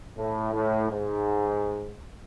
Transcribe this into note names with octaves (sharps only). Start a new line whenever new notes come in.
A2
A2
G#2